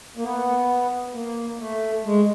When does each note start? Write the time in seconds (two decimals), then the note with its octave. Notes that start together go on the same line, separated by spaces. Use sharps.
0.17 A#3
0.24 B3
1.14 A#3
1.59 A3
2.05 G#3